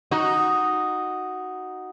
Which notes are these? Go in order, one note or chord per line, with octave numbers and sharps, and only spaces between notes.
D#4 F#4